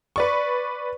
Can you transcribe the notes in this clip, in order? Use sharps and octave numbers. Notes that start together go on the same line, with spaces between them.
B4 D5 C#6